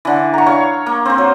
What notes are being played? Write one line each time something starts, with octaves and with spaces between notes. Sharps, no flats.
D3 E3
A#5 C#6
C#5 F5
A#3
C4 C5
F#3